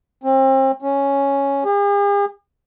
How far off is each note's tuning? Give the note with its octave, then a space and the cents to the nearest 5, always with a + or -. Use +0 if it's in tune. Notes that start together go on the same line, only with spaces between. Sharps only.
C4 +35
C#4 +0
G#4 -45